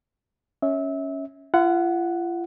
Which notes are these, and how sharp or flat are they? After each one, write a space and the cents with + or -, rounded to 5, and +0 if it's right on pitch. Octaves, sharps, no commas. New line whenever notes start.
C#4 +0 E5 -25
F4 -40 F#5 +0